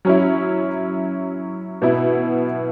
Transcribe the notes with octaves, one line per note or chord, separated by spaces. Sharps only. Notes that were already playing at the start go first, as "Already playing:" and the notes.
F#3 C#4 E4
B2 B3 E4